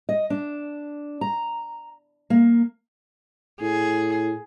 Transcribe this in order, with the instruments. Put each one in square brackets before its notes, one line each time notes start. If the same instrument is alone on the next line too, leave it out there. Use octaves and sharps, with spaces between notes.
[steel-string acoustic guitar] D#5
D4
A#5
A#3
[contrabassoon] A2 [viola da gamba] G#4